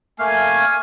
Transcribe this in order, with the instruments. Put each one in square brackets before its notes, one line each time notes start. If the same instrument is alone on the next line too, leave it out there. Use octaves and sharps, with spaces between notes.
[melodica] A3 A#3 F5 [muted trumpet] G#5